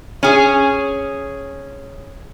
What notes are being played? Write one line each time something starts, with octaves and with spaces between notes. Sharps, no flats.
C#4 G#4